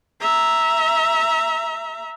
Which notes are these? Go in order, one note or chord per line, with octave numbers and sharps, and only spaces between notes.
E5 A#5